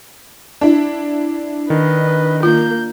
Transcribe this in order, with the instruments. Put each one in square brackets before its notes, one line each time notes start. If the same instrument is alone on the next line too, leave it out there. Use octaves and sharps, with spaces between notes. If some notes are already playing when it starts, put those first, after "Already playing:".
[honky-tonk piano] D4 E4
[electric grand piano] D#3 [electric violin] B4 D#5
[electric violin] A#3 G6 [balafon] F4